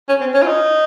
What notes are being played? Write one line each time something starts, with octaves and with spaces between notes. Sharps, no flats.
C#4
C4
C#4
F4
D#4